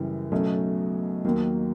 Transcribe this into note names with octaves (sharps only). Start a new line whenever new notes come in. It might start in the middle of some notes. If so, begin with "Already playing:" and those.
Already playing: F#2 C#3 E3 G3
B1 B2 F#3 A3 C#4
D#2 D#3 F#3 A#3